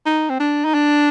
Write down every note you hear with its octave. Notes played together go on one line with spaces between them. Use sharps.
D#4
C4
D4
D#4
D4